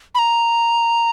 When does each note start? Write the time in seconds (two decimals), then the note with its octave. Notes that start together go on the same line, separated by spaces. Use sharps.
0.15 B5
0.19 A#5